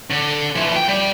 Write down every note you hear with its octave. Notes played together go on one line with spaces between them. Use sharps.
D3
E3 F3
G5
G3